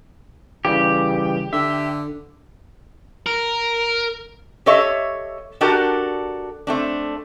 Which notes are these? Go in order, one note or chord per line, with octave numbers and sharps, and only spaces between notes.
C#3 E3 G3 G4
D3 E5
A#4
G4 A4 C#5 D#5 E5
D4 F#4 G4 A4 A#4 D5
A3 C4 D4